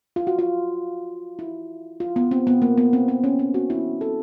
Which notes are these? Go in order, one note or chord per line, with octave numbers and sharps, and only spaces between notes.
F4
F#4
F4
E4
F4
B3
C4
B3
A#3
B3
C4
C4
C#4
C4
F#4
E4
A4